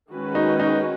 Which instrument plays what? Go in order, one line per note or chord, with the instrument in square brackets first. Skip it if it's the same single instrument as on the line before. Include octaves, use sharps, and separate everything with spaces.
[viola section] D#3 G#3 C#4 F#4 B4
[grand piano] D#4
D#4